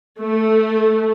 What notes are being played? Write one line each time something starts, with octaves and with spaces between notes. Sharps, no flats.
A3